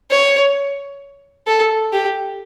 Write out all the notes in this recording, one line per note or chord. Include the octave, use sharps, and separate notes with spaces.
C#5
A4
G4